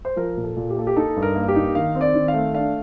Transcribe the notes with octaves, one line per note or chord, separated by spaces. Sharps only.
C5
F3 A#4
A#2
A4
A#2
G4
A#3 A4
G4
D#4 A4
G2
A#4
A#3
G4
D#4
D#3 F5
C4
D5
D#3
F5
A3
D4 F5